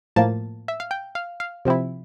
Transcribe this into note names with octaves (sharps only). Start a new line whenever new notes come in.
A2 F3 A#3 A5
E5
F5
G5
F5
F5
C3 F3 C4 E4